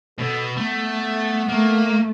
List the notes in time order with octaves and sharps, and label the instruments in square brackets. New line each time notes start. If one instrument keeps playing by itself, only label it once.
[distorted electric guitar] B2 [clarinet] A4
[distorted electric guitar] A3 [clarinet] B3
[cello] A3 [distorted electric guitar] A#3